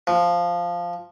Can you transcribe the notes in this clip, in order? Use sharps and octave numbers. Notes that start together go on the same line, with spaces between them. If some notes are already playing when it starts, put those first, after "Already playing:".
F3